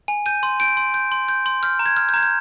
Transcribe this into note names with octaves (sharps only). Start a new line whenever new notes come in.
G#5
G6 D#7
C6
G6 D7
C6
G6
C6
G6
C6
F6 G6
A#5
G#6
F6
G6
A#5 G#6
G6